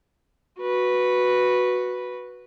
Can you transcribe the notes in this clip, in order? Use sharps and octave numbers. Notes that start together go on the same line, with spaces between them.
F#4 B4